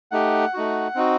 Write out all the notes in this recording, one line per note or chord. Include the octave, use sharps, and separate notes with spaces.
A3 D#4 G4 F#5
A3 D#4 F#4
C4 D#4 F#4